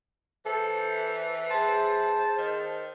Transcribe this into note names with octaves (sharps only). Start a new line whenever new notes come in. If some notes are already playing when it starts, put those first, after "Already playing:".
E3 A4 C5 E6
G#4 C5 A5 C6
D#3